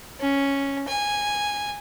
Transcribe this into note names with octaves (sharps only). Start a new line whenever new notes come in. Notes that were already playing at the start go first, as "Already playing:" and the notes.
C#4
G#5